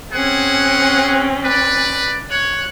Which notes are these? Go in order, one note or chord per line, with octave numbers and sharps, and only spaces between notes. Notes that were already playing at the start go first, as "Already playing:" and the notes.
C4 C#4 G#4 F#5
B4 D5
C#5 F#6